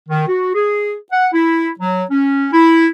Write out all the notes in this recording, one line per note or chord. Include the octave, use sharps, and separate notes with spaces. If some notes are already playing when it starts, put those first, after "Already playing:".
D#3
F#4
G#4
F#5
E4
F#3
C#4
E4